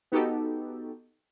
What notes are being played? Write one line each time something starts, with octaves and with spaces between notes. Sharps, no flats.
B3 D#4 F#4 G4 A4